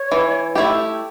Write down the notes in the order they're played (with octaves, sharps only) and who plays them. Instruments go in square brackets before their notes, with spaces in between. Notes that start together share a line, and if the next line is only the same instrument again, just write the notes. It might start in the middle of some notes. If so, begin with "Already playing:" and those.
Already playing: [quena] C#5
[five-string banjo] E3
A3 E4 G4